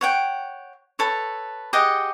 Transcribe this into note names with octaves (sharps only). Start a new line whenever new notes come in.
C#5 F#5 G5
A4 B4 C#5
G4 G#4 D#5 F#5